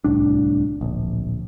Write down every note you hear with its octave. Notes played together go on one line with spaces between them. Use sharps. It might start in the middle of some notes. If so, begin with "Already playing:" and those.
D1 C2 A2 D4
D1 A#1